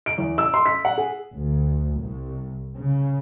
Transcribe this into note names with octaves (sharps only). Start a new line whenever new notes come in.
D7
E2
E6
C6
B6
F#5
G#4
D2
C2
C#3